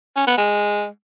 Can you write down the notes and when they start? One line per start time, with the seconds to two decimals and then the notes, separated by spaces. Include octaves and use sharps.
0.16 C#4
0.27 B3
0.38 G#3